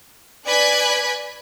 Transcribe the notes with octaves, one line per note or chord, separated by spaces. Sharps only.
B4 D5 G#5 F#6 G#6 B6